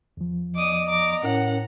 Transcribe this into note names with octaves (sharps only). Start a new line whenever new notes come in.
E2 F3
B3 D5 D#5 D6 D#6
A#5 D6
A2 C#4 E4 A#4 F#5